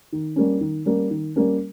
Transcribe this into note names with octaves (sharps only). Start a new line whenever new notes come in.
D#3
G3 A#3 C#4
D#3
G3 A#3 C#4
D#3
G3 A#3 C#4